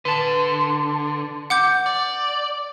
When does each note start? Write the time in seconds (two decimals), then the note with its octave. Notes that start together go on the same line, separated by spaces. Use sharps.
0.05 D3 B4 A5
1.50 F#5 D6 G6
1.86 D5